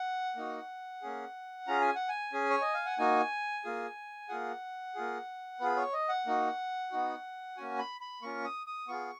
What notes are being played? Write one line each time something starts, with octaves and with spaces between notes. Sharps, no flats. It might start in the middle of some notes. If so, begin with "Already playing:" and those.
Already playing: F#5
A#3 D#4 F#4
A#3 C#4 G#4
C#4 F4 G#4 A#5
G#5
F#5
G#5
C#4 G#4
C#5
D#5
F5
F#5
A#3 D#4 F#4 G#5
A#3 F4 G#4
A#3 F4 G#4 F#5
A#3 F4 G#4
B3 F4 G#4 B4
C#5
D#5
F#5
A#3 D#4 F#4
B3 D#4 F#4
A#3 C#4 F#4 G#5
B5
B5
A#3 C#4 F4 C#6
D#6
D#6
B3 F4 G#4 C#6